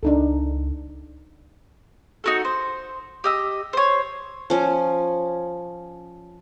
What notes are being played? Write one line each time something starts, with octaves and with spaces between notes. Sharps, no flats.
C#2 D4 D#4 A4
D#4 F#4 A4
C5
G4 D#5 E6
C5 C#5
F3 C#4